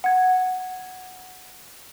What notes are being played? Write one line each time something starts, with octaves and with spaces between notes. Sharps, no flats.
F#5 G#6